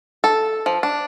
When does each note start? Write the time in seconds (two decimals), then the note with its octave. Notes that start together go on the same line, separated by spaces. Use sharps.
0.24 A4
0.66 F3
0.83 D4